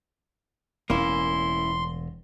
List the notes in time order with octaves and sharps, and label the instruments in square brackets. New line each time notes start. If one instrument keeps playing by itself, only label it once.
[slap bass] E1 A2 [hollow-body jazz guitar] A#3 C#4 E4 [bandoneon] C6